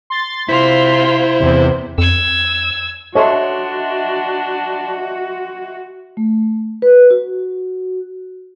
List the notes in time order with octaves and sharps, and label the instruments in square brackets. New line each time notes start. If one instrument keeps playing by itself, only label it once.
[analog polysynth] C6 A6
[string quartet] C3 F4 [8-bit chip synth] E4 C5 [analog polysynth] C6 B6
[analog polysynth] E2 C3
[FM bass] F2 [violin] E6 G#6
[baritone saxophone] D4 [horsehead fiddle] F#4 [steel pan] A4 C#5 [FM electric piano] D#5 E5 C6
[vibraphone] A3
B4
F#4